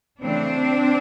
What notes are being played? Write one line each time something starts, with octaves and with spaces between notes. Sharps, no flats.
C#3 E3 A3 C4 D4